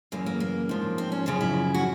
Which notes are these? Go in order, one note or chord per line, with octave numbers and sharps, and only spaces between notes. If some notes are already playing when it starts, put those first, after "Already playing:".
F#2 C#3 E3 A#3
A#3
A#3
G#2 F3
C4
C#4
F#2 C#3 F3 D#4
E4
F#4